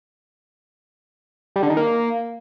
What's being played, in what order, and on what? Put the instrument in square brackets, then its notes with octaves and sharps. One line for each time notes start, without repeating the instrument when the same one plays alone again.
[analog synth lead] G3
D3
D#3
A#3